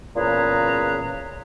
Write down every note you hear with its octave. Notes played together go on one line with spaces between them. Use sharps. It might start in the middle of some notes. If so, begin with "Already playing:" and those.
E2 A#2 C#3 G#4 B4 A#5